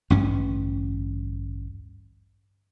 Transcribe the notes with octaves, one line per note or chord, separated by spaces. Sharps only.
A1 D2 G2 C#4